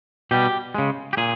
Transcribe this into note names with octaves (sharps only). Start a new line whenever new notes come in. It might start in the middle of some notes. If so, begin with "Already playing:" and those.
B2 G3 G4
C#3 G#3
G4
A#2 G#4